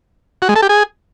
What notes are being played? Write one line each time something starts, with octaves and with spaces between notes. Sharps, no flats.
F#4
G#3
A4
G4
G#4